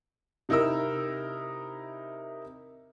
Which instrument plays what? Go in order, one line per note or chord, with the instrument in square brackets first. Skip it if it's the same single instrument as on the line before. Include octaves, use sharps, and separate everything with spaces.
[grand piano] C3 D#4 E4 A#4 E6